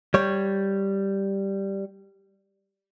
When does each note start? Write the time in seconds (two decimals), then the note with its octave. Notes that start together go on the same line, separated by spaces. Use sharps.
0.14 G3 C#5